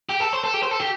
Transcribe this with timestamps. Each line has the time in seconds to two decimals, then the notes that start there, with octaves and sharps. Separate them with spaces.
0.09 G4
0.20 A4
0.33 C5
0.44 A4
0.54 G4
0.63 C5
0.71 A4
0.80 G4